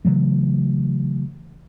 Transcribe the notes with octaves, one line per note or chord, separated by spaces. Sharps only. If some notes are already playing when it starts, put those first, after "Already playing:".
C#3 E3 F#3 A3